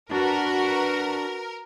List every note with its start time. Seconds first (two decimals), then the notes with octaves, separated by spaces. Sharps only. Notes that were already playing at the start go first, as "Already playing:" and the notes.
0.11 D4 F#4 A#4 B4